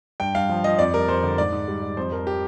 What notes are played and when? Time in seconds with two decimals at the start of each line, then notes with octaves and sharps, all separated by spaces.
0.20 G2 G5
0.35 G2 F5
0.49 F3
0.64 F3 D#5
0.78 F2 D5
0.94 G3 A#4
1.08 F2 C5
1.24 D3
1.38 G#2 D5
1.52 G#2
1.68 G3
1.82 G3
1.97 F2 C5
2.12 F3 A#4
2.27 G4